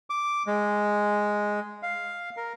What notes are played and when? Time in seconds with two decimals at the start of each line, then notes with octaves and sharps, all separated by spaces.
0.10 D6
0.47 G#3
1.83 F5
2.37 A#4